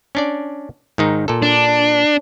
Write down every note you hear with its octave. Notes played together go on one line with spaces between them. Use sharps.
C#4 D4 D5
G#2 D#3 D#4
A#2 A4
D4